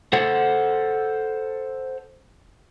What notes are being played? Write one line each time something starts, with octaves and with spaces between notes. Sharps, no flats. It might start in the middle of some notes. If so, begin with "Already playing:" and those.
A4 C5 F#5